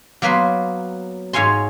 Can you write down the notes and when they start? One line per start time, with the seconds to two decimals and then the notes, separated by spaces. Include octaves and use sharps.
0.22 F#3 A#3 B3 B4 C6
1.33 G#2 C#5 F5 G#5 C6